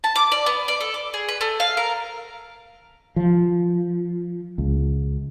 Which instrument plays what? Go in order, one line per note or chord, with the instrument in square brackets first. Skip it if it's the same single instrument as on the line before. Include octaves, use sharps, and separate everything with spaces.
[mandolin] A5
D6
D5
B3
D5
A4
D6
G#4
B4
A3
F5
A#4
[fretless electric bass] F3
C#2